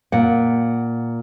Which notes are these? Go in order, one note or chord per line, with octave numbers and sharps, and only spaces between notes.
A#2 F#5